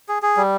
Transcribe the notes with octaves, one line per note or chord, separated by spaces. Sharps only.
G#4
G#4
G3